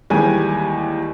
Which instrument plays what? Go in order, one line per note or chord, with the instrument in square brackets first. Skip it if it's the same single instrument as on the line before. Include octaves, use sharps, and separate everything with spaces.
[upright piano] D#2 E3 G3 G#3 G#5